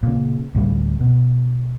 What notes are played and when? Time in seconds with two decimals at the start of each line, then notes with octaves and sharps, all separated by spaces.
0.03 A#2 C#3
0.55 D2 A2 G3
1.00 B2